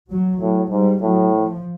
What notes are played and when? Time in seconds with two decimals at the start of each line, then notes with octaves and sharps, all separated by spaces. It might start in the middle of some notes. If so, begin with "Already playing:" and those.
0.09 F#3
0.39 A2 F#3
0.70 G#2 G3
1.02 A2 F#3
1.32 F3